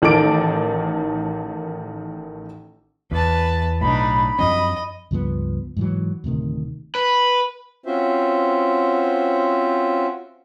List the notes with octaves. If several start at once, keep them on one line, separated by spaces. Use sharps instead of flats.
A1 D#3 A4 D6 D7
E2 B4 A5
B1 A2 D4 D#4 B5
F#2 F3 C4 D#5
C#2 G2 F3 B3
G#2 E3 F#3
D1 A2 C3 D#3
B4
C4 C#4 F4 F#4 C5 E5